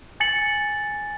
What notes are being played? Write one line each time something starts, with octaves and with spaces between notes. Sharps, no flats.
G#5 A6 C#7 F#7